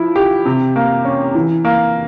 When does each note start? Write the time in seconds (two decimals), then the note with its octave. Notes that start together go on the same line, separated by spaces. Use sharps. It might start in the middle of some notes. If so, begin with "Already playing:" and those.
Already playing: F3 E4
0.16 G4
0.46 C3
0.76 A#3
1.05 C#4
1.35 E3
1.65 A#3